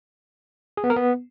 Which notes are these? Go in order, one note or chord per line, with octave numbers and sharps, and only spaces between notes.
G#4
B3
A#4
B3